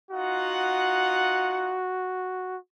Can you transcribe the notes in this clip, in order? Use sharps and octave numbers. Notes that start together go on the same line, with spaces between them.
D#4 F4 F#4 F#5